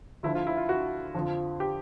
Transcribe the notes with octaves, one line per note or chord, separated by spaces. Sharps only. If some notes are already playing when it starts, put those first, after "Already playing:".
D2 D3 F3 E4
F4
E4
F4
F#4
F2 D3 F3
G4